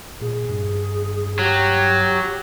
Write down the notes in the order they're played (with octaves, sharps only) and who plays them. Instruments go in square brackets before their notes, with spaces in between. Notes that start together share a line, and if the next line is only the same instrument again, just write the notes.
[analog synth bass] A#2 [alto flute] G#4
[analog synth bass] G2
[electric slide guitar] F#3 [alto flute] G4